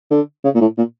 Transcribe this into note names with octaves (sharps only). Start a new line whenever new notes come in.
D3
C#3
A#2
A2
A#2